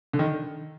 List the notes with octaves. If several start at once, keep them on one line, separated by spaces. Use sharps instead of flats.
D3
D#3